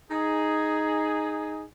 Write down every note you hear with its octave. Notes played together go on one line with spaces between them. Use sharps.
D#4 G#4